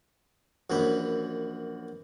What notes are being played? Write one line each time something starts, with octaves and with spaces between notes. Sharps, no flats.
A#1 F#2 E3 B4